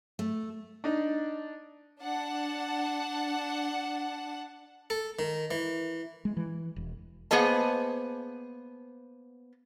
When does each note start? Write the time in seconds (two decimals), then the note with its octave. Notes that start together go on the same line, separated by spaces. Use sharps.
0.19 A3
0.84 D4 D#4
2.00 D4 F#5 A5
4.90 A4
5.19 D#3
5.51 E3
6.25 G#3
6.37 E3
6.76 E1
7.31 A#3 B3 G#4 C5 D#5 A5